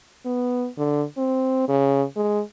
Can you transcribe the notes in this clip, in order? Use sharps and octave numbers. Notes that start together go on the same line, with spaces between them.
B3
D3
C4
C#3
G#3